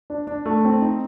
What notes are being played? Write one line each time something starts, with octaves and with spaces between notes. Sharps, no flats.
D4
D4
A3
C4
D#4